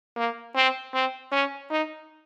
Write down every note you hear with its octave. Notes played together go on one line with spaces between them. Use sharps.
A#3
C4
C4
C#4
D#4